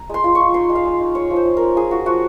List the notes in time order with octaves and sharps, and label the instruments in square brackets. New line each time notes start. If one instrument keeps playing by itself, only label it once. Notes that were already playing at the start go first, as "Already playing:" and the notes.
Already playing: [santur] A#5
G#3 C6
F4
C#6
F4
D#4 C6
G#3
F5
G#3
D#4
G#3 C#5
F3
C5
F3
C#4 A#4
F3 G#4
F4 F#4
F3 F#4